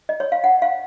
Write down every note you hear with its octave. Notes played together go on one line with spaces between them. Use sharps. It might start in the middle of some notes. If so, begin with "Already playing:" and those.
D#5
C#5
F5
F#5
F5